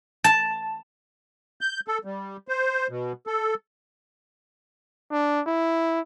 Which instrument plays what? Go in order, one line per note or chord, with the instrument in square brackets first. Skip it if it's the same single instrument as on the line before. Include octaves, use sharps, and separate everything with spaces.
[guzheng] A5
[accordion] G6
A4
G3
C5
B2
A4
[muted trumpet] D4
E4